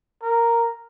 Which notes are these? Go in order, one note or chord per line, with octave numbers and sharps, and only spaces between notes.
A#4